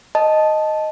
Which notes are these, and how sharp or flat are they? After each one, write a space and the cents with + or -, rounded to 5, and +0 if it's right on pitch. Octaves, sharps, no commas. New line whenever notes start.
D#5 +0 A5 -10